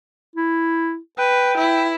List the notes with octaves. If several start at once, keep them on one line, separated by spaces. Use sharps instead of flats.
E4
B4 G5
E4